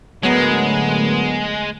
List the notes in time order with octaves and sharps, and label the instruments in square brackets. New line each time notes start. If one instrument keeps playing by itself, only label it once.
[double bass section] A2 D3 A3 [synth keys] F#3 B3 A#4 [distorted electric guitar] G#3